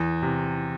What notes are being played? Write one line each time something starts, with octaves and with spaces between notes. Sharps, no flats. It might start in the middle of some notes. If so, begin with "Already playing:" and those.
Already playing: E2
C3